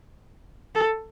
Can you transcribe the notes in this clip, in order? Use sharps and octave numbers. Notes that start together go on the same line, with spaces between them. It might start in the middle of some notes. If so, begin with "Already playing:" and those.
A4